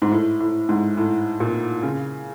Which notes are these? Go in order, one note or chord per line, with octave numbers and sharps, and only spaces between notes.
G#2
A2
A2
G#2
A2
A#2
C#3